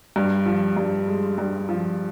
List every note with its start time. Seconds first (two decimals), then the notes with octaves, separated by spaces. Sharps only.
0.16 G2
0.46 F3
0.77 G2
1.07 G#3
1.38 G2
1.69 F3